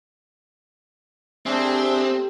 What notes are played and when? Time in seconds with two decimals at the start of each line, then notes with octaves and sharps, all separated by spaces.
1.46 G3 A3 C4 D4 G#4 E5